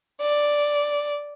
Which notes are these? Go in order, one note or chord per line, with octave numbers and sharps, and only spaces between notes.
D5